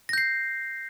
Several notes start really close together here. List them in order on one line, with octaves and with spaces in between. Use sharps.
A#6 G6 C7